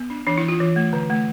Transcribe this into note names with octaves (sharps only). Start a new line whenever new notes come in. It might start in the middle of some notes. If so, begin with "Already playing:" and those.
Already playing: B3
D4
E3 D4
E4
E3
F4
E3
A3
D3
A3